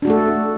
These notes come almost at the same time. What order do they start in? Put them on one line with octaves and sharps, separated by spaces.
D4 F#4 A3 A4